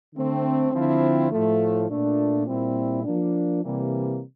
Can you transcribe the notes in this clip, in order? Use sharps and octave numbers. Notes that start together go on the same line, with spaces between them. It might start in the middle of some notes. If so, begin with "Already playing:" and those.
D3 A3 C4
D3 F3 C4 E4
A2 F3 A3
A#2 A3 D4
A#2 G3 C4 E4
F3 A#3 D4
C3 E3 G3 A#3